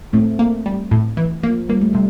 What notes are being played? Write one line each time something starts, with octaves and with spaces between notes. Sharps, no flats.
A2 A3 C4
A#3
G3
A2
E3
F3 A#3
G3 A#3
A3
C3 G3